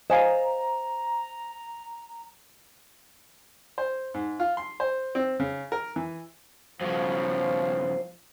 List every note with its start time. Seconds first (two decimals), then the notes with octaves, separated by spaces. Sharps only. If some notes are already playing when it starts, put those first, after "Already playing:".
0.10 C5 D#5 F5 G#5 A#5
3.78 C5
4.14 G#2
4.40 F4
4.57 C6
4.80 C5
5.15 C4
5.40 C#3
5.72 A#4
5.96 E3
6.81 B1 G2 C#3 F3 C5